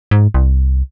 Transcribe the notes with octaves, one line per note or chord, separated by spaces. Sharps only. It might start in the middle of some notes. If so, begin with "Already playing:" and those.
G#2
C2